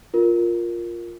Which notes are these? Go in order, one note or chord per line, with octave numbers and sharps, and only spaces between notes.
F4 A#4